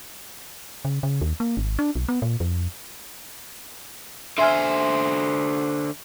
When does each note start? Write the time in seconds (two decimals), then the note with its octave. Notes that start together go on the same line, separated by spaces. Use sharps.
0.85 C#3
1.03 C#3
1.21 D#2
1.40 A#3
1.57 G#1
1.79 D4
1.95 B1
2.08 B3
2.22 A#2
2.40 F2
4.38 D3 C5 E5 G#5 F6